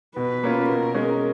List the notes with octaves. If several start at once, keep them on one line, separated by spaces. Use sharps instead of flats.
B2 B4
A#3 C#4 F4
B2 A#4
G#3 C#4